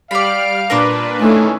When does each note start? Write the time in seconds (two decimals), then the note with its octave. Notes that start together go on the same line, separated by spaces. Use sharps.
0.11 G3 D5 F5 B5 F6 D7
0.70 A#2 D4 A#4 B4 C6 D6
1.20 D#3 E3 A3 C#4